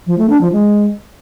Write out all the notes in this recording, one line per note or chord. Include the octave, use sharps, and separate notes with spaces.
F3
A3
D4
F3
G#3